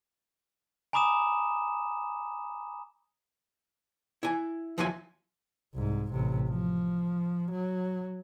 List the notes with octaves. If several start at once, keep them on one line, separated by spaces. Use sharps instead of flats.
G#5 A#5 B5 D6 D#6 E7
E4 G#5
D#2 F3 F#3 E4 B4 G#5
C2 G#2
A1 C3
F3
F#3